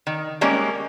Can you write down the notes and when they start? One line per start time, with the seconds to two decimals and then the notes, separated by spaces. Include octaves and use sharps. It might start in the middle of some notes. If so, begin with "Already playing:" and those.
0.07 D#3
0.41 G3 G#3 A#3 C#4